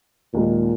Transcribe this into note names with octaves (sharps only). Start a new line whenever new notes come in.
D#2 A#2 D#3 G#3